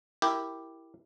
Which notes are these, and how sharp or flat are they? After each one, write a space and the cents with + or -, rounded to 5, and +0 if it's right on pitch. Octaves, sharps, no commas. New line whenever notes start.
E4 +0 G4 +0 A#4 +0